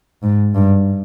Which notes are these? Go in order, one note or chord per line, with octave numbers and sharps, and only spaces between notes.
G#2
G2